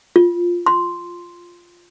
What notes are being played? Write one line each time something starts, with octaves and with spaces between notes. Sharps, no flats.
F4
C6